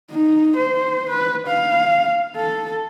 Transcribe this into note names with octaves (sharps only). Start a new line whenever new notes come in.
D#4
C5
B4
F5
A4